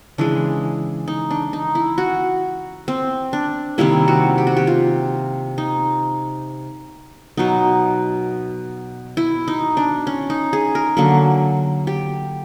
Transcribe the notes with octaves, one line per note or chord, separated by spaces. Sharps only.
C#3 E3 G#3 D4
D#4
D4
D#4
E4
F#4
C4
D4
C3 D#3 G3 A#3 E4
F#4
G4
F#4
G4
F4
D#4
B2 F#3 B3 D#4
E4
D#4
D4
C#4
D#4
G#4
A#4
D3 F#3 A#3
G4